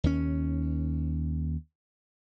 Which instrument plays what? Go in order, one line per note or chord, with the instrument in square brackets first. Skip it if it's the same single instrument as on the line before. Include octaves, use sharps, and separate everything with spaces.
[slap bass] D#2 C#4